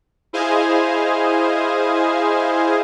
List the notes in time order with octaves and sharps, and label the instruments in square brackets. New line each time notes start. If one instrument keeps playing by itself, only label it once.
[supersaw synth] E4 G#4 C5 D#5 F5 G#5